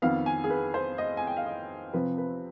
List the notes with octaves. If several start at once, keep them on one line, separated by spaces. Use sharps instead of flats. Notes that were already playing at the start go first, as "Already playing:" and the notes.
F2 D#3 B3 F5
G#5
G#4
B4
C5
D#5
G#5
G5
F5
D#5
C3 F3 C4 B4
B4